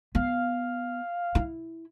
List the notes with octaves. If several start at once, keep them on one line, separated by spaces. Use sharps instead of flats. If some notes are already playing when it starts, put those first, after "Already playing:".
B3 F5
E4